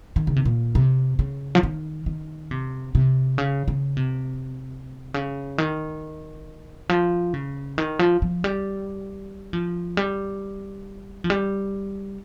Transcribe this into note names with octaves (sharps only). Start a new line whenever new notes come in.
D#3
C#3
C3
A#2
C3
C#3
F3
D#3
D#3
C3
C3
C#3
C#3
C3
C#3
D#3
F3
C#3
D#3
F3
F3
G3
F3
G3
F3
G3